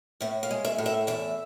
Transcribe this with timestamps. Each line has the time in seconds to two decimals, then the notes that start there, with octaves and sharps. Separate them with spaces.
0.21 A2 E5
0.43 F5
0.51 G#3
0.65 E5
0.78 A2
0.86 E5
1.07 E2 E5